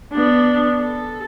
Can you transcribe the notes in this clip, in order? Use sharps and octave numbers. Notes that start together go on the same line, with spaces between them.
B3 D4
A4